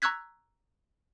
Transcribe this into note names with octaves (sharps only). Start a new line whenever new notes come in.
A#5 C#6 E6 F#6 G#6 B6